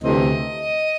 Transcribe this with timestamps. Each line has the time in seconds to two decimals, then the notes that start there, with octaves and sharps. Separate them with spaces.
0.01 D2 C3 E3 A3 C4 D#5